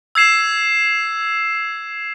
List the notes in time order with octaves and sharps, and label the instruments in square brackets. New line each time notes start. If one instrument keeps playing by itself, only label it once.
[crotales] E6 G#6 C7 E7